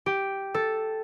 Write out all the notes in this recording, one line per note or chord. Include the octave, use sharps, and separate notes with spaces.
G4
A4